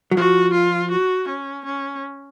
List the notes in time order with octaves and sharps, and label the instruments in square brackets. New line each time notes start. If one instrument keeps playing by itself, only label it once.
[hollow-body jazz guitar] F#3
[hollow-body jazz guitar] F3 [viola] F#4
[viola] F4
F#4
C#4
C#4